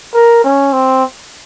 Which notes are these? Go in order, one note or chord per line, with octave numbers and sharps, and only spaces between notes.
A#4
C#4
C4